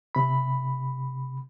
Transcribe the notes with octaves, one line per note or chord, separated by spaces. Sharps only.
C3 B5